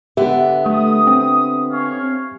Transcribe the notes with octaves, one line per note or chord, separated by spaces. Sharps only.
D3 B3 G4 E5
A3 D#6
C4
C#4 C#5 F5